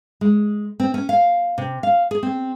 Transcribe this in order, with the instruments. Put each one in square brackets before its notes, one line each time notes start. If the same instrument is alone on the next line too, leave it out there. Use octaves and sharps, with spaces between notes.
[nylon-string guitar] G#3
C4
C#4
F5
C3
F5
G#4
C4